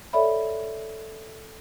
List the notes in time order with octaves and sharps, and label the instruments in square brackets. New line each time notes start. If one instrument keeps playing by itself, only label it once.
[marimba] A4 C#5 D5 E5 B5